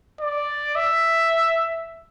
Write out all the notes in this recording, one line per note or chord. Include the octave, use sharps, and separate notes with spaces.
D5
E5